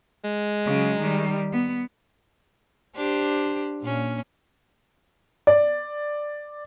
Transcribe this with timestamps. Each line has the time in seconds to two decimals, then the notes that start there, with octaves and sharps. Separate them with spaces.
0.24 G#3
0.65 C#3 F#3
0.99 D#3 G3
1.52 B3
2.96 D4 G4 C5
3.81 A#2 A#3 C#4
5.47 D5